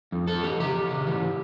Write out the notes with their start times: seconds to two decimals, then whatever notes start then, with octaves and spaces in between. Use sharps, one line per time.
0.12 F2
0.27 F2 A4
0.44 E3 G4
0.60 C#3 G4
0.75 E3
0.91 C#3
1.07 E3